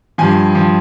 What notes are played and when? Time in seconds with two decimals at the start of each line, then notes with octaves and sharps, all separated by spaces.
0.18 G2 F3 G#5
0.55 F3